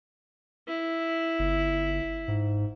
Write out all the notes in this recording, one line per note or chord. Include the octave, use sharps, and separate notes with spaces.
E4
G1
G#2